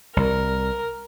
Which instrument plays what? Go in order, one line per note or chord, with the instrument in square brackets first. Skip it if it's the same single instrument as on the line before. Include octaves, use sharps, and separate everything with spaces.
[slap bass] C2 [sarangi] A#4